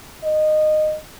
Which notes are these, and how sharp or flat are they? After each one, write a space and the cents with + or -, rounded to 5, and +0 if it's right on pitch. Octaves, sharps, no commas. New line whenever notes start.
D#5 -15